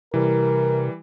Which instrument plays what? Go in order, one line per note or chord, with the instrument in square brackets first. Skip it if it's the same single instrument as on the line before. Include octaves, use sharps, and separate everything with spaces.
[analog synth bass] C3 [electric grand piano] E3 G3 [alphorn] A#4